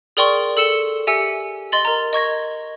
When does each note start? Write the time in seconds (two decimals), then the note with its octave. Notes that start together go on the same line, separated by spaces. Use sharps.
0.17 G#4 A#4 D5 G5 C6 C#6
0.57 A4 E6 C#7 E7 G7
1.07 G4 E5 G#5 E6 C#7
1.72 D#5 C6 A6 F#7
1.85 A#4 A#5
2.13 D#5 C#6 G#6 A#6